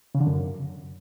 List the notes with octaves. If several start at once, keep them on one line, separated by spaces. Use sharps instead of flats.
C#3
D3
F#2